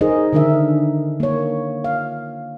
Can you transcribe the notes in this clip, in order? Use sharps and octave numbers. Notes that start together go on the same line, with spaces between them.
D#4 G#4 A#4 C5 D#5
D3 D#3 D4 A#4 E5
A#3 C#5
F5